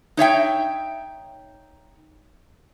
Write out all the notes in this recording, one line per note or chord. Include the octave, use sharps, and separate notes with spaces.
D#4 C#5 E5 G5